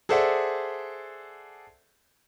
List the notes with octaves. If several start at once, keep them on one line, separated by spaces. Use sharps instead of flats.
G#4 A4 C5 D5 E5 F#5